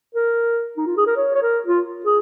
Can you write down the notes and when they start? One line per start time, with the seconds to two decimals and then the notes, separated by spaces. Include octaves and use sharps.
0.15 A#4
0.77 D#4
0.86 F4
0.97 G#4
1.07 A#4
1.17 C#5
1.34 C#5
1.42 A#4
1.67 F4
2.06 G#4